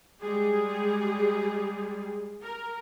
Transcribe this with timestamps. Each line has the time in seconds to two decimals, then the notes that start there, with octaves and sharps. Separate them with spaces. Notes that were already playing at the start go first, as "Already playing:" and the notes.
0.21 G3 G#3 G#4
2.42 A#4